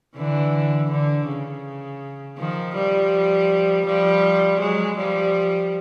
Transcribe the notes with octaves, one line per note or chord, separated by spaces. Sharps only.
D3 E3
D3
C#3
D#3 F3
F3 G3
F3 G3
F#3 G#3
F3 G3